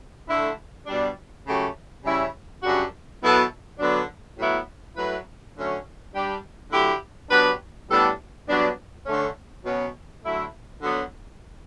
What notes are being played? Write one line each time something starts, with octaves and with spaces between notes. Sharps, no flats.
D3 A3 E4
B2 G3 D4
C#3 F#3 A3 C#4 G4
C#3 G3 C#4 E4
F#2 C#3 G3 D4 F#4
B2 F#3 B3 E4 A4
D3 F#3 B3 D4
A2 F#3 B3 E4
F#3 A3 E4 B4
D3 F#3 A3 C#4
G3 D4 G4
D3 F#3 A3 E4 G4
F#3 B3 D4 G4 B4
A2 G3 B3 D4 A4
G2 F#3 B3 D4
D3 A3 C#4
B2 F#3 C#4
D3 F#3 A3 E4
D3 F#3 B3